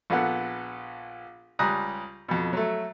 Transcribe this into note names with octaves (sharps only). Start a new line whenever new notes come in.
A#1 A#2 B3 A4 F#5
C#2 G3 A#5 D#6 F#6
F2 B2
F#3 A3